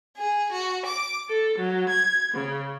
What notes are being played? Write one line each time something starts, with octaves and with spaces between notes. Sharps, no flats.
G#4
F#4
D6
A4
F#3
G#6
C#3